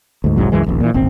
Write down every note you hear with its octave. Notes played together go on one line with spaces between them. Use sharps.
D2 G#2
F1 C2 G#2 F#3
C2 F#2 E3 G#3
D#1 A#1
A#2 E3
D#1 G#1 C4